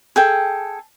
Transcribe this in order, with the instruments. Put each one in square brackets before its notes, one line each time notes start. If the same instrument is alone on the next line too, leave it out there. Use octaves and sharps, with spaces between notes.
[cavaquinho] G#4 A4 G5